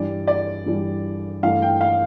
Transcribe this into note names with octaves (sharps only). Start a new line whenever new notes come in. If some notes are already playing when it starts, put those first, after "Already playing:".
Already playing: G2 E3 G3 D5
D5
G2 E3 G3
G2 E3 A3 F5
G5
F5